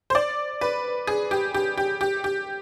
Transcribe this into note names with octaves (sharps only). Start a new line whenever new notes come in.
C5
D5
B4
G#4
G4
G4
G4
G4
G4